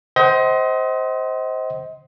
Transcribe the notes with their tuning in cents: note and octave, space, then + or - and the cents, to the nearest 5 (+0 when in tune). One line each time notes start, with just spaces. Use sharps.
C5 +0 D#5 +30 F#5 +40